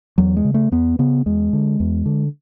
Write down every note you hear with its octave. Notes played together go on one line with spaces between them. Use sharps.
E2 F#3
G#3
C#3
A3
E2 B3
C#3 B3
E2 G#3
D3
E2
D3